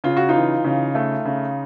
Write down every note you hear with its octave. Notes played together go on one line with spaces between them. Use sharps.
C#3 F4
F#4
D#4 F4
E3
C#3
A3
C#3